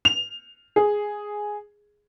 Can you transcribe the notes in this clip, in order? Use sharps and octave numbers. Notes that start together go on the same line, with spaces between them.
F7
G#4